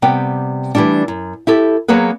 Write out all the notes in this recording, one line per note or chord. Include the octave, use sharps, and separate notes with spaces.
C3 G3 B3 G5
E3 F#3 G3 A3 D4
F#2
E4 G4 A4
F#3 A#3 B3 G#4 B4